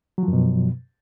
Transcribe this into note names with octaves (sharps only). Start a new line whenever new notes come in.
F#2 B2 F3 F#3